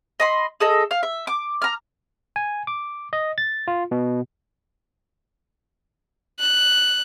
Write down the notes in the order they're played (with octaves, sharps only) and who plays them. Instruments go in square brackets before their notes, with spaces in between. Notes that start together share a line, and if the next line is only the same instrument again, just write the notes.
[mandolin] D#5 B5 C6
G#4 A4 D#5
F5
E5
D6
A#5 F6
[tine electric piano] G#5
D6
D#5
A6
F4
B2
[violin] F#6